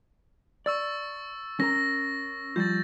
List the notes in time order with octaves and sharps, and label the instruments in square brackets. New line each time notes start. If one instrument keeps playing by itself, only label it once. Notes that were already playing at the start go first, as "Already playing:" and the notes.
[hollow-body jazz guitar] D5 [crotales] C#6 E6 A6
[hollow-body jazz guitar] C#4 A#4 A#5 [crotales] A#6
[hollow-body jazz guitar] F3 G3 F4 [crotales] G6 A6